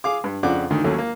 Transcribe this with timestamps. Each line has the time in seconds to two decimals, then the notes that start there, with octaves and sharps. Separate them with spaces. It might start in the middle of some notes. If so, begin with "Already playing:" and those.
0.04 G#4 F5 D6
0.24 G2
0.43 F2 C#3 D4 F#5 D6
0.70 D2 D3 D#3
0.84 D#2 F#3 A3 C#4
0.98 A#3